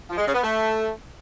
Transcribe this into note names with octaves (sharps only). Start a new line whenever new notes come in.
F3
G#3
C#3
B3
A3